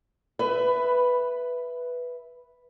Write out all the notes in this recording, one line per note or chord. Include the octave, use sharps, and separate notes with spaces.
B4 E5